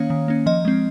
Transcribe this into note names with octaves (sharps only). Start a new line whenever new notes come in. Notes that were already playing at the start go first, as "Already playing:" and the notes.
Already playing: D#3 A#3 C#4 C#5 F5
D#3
A#3 C#4
F3 D#5
G#3 C4